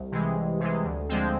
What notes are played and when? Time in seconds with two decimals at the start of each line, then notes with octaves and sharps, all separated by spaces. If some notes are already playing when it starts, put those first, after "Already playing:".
Already playing: C2
0.12 C3 E3 G#3
0.36 C2
0.60 C3 E3 G#3
0.84 D2
1.09 D3 F3 G#3 C4